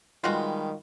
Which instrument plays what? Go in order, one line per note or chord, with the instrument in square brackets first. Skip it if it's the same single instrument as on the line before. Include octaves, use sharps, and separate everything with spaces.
[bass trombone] D#3 [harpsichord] G3 G#3 B3 [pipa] F4 F#4